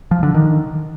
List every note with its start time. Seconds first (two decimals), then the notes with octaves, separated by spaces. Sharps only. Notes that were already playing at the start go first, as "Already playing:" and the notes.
0.11 F3
0.23 D3
0.34 D#3